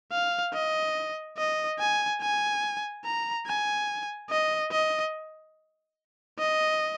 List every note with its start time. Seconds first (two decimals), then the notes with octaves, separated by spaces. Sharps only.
0.12 F5
0.54 D#5
1.38 D#5
1.79 G#5
2.21 G#5
3.04 A#5
3.47 G#5
4.30 D#5
4.72 D#5
6.39 D#5